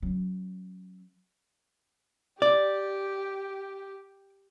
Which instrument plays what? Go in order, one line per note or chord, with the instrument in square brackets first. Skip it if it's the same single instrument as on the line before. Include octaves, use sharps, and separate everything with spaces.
[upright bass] F#3 C#4
[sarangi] G4 [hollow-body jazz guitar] D5